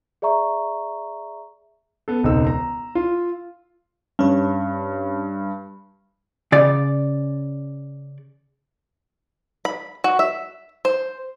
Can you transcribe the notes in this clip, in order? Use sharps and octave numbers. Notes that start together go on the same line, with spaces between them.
G#4 D5 E5 A#5 C#6
B3 A4
E1 C#2 C4 D#4 E6
A#5
F4
G2 C#4 C#5
C#3 D5
B5
F#4
E5
C5